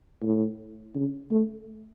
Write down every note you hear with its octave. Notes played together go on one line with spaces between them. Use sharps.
A2
C#3
A3